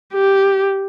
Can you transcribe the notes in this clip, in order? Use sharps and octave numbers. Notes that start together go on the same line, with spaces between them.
G4